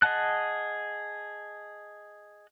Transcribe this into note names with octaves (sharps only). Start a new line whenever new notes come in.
G#4 D#5 F#5 A5 F#6